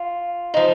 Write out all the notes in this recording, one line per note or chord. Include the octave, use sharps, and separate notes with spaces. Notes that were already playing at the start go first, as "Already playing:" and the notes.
Already playing: F4
F3 D#4